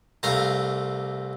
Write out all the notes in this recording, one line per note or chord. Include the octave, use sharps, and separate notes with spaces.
C2 C3 A3 F5 A#5